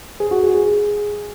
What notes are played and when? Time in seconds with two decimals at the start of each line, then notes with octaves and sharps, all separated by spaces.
0.20 G#4
0.31 F#4
0.43 G#4
0.54 G#4